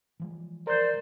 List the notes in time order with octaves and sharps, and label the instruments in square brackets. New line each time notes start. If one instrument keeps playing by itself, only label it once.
[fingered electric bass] E3 F3 G#3
[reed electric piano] A#4 G6 [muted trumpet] C5 [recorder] D5